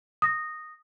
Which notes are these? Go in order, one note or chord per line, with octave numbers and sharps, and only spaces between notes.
D#6 A#6